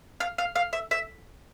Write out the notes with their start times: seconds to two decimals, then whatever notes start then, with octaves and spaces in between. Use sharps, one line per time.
0.20 F5
0.38 F5
0.56 F5
0.73 E5
0.91 E5